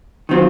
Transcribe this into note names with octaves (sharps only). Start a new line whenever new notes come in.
D#3 F#3 C4 F4